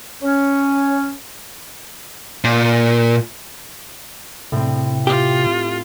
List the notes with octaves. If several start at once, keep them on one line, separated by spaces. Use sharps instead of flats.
C#4
A#2
A2 C3 C4
F4 G4